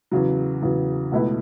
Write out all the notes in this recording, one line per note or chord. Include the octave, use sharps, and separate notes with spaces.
E2 C#3 F#3
E2 C#3 F#3
C#2 B2 A3 E4 B4